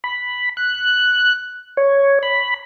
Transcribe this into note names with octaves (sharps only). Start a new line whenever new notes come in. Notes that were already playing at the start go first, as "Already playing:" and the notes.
B5
F#6
C#5
B5